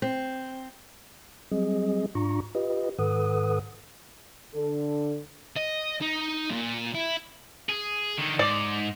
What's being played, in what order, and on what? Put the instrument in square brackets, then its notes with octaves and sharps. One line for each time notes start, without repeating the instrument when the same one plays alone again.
[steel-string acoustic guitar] C4
[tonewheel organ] F#3 G3 C4 G#4 D#5
G#2 D4 F4 A#5 C#6
F4 G4 B4 D#5
G#2 D#3 A4 B4 F#5 D#6
[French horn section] D3 A4
[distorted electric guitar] D#5
D#4
A#2
E4
G#4
D3 D#3
[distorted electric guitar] G#2 [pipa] D5